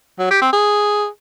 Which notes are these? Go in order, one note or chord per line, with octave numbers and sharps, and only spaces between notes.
F#3
G4
C4
G#4